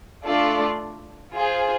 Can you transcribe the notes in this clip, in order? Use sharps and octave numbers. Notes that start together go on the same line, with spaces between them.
A3 D4 F4 A4 D5
F4 G#4 C5